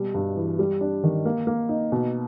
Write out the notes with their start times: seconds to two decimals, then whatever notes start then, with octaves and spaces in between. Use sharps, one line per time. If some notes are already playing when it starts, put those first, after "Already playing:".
Already playing: B2 G3
0.14 G2
0.37 E3
0.59 G3
0.81 D4
1.04 D#3
1.25 A#3
1.47 A#3
1.69 D#4
1.92 B2